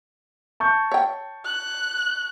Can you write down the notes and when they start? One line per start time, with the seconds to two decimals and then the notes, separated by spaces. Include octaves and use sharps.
0.60 A5 C#6 G6
0.92 C#5 G5
1.45 F#6